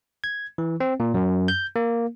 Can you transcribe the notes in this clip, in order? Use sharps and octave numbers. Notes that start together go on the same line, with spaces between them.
G#6
E3
C4
A#2
F#2
G6
A#3